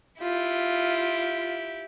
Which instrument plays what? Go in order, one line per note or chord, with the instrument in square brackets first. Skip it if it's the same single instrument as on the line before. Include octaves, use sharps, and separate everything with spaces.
[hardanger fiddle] E4 G4 [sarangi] F4